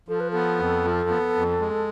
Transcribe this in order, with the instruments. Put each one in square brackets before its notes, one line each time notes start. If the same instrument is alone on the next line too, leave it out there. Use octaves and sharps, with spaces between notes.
[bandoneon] F3 [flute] A4
[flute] B4
[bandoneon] B3 [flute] A4
[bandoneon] F2
F3
B3
F2
G#3